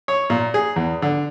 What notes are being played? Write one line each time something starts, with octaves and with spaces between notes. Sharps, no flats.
C#5
A#2
G#4
E2
D3